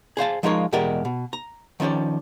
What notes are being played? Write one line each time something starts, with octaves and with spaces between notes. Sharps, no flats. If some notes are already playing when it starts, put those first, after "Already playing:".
G#4 C5 F5 A5
F3 G#3 D#4 F4 A#4 C#5
E2 B2 G#3 G4 A#4 D5
B2
A#5
D#3 F3 C#4 G4 D5